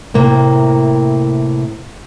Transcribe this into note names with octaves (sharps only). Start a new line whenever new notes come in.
A2 C3 A#3 C4